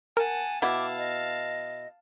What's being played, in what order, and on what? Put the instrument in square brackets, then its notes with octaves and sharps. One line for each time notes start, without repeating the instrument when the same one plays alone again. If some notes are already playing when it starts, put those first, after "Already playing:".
[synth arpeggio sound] A#4 [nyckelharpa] F#5 A5 [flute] G#5
[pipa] B2 E4 [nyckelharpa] F5 A5 [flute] D6
[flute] D#5